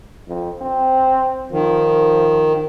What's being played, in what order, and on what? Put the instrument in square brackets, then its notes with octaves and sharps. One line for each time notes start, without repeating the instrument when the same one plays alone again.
[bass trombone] F2
C4
[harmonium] D#3 [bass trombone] F3